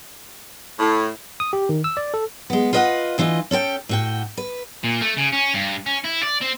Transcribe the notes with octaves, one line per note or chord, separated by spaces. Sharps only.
A2
D#6
G4
D#3
E6
D5
A4
G#3 B3
F4 B4 D#5 E5 F#5
D2 E3 F4 C5 D#5
C#4 A4 B4 G5
A2 F#4 G5
B4
A#2
A3
C#3
C#4
G2
C#4
E4
D5
C4